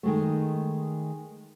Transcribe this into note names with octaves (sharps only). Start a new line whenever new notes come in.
D#3 G#3 A3